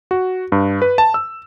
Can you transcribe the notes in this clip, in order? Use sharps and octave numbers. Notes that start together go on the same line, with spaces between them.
F#4
G2
B4
A5
E6